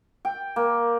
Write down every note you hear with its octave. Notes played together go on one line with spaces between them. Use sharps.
G5
A#3